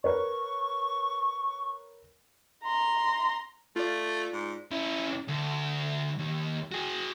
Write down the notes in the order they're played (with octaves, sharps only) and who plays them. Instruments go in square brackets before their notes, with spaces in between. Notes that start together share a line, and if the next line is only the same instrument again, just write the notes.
[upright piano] A#4 B4 C#5 [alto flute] C#6
[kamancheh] A#5 C6
[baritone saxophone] A3 [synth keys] F4 D5
[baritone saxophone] G#2
[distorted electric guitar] C#4 E4
D2
D#2
F#4 G#4